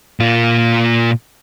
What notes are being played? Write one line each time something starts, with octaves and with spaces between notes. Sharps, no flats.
A#2 F4